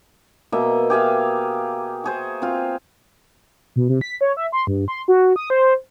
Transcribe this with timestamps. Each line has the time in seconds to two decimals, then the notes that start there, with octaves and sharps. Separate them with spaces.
0.52 B2 A#3 D#5 E5
0.90 G4 G#4 E5 F5
2.04 F#4 G#4 C5
2.42 C4 F4
3.76 B2
3.89 C3
4.01 B6
4.21 C#5
4.37 E5
4.52 C6
4.67 G2
4.88 C6
5.08 F#4
5.36 D#6
5.50 C5